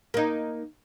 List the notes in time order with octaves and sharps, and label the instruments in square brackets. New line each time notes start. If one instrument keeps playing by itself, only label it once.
[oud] A#3 D#4